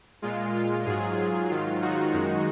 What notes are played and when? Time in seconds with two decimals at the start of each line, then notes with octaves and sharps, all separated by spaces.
0.22 A#2 G#3 F4
0.54 F4
0.86 G#2 F#3 F4 G#4
1.18 F4
1.49 G#2 D#3 F#3 F4
1.82 D#4 F#4
2.13 F#2 D#3 G#3